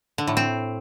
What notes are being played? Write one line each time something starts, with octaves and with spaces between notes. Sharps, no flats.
D3
A2
C4